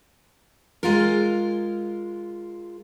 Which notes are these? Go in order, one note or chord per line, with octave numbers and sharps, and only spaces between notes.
G#3 F4 A#4